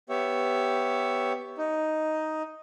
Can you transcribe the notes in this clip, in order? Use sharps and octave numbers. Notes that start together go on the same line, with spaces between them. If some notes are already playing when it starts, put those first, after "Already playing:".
B3 G4 C#5 E5
D#4